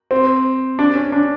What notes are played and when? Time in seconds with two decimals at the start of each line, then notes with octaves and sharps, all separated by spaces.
0.11 C4
0.79 D4
0.95 C#4
1.12 D4